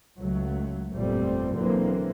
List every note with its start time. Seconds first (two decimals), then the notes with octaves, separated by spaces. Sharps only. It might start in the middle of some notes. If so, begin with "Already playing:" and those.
0.20 C#2 F#3 A3
0.92 G1 F2 A#2 G3 A3 C4
1.56 B1 D3 E3 F#3 A#3 C4